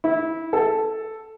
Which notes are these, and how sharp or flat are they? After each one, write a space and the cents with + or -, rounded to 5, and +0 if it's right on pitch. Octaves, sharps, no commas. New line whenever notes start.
E4 -20
A4 +0